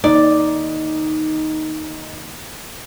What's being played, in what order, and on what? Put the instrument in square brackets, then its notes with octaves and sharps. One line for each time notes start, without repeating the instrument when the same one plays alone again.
[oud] D#2 D5 [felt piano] D#4